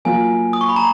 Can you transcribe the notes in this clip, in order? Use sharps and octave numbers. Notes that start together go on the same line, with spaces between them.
F#3 A#3 F4 G#5
D#6
C#6
B5
A#5